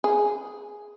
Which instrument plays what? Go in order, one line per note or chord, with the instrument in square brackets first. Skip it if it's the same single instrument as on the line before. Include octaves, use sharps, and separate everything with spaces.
[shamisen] G#4